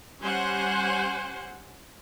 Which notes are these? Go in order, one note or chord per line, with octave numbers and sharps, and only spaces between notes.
G3 C#4 C5 F#5 G#5